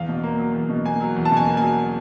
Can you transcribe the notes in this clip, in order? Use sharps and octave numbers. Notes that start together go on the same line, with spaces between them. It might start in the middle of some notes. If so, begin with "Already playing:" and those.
Already playing: E2 F5
B2
A#3
F#3
E2
B2
A#3 G#5
F#3
E2
A5
B2
G#5
A#3
F#3 G#5